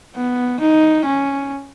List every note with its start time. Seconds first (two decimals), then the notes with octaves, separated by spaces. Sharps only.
0.16 B3
0.60 D#4
1.05 C#4